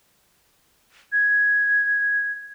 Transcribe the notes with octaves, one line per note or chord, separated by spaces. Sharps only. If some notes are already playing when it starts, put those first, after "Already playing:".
G#6